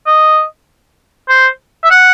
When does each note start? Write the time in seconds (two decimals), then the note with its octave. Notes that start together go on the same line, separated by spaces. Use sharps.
0.06 D#5
1.29 C5
1.84 E5
1.91 F#5